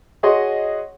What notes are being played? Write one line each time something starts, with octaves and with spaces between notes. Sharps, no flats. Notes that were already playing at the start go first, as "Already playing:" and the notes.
F#4 G#4 C#5 D#5 F#5 C6